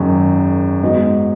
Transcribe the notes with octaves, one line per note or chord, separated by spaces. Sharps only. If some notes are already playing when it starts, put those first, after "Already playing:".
Already playing: G#1 F#2 D#3 G#3
G#2 G#3 B3 D#4 F#4